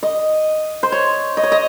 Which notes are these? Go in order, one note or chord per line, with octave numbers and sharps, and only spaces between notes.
D#5
C5
C#5
D#5
C#5
D#5